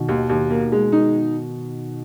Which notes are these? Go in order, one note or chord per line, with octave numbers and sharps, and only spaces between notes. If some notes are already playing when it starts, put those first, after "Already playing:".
Already playing: B2 D#3
D#2
D#2
A#3
G#3
D#4